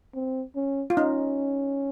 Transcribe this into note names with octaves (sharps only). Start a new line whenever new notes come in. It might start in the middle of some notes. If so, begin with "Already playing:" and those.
C4
C#4
F4
C#4 D#4